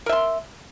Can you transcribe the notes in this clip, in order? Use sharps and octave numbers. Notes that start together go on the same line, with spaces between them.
A#4 E5 C6